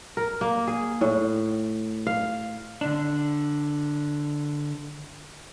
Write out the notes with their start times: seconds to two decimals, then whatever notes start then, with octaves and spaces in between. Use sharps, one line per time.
0.17 A#4
0.41 A#3
0.67 G#4
1.01 A2
2.07 F5
2.81 D3 D4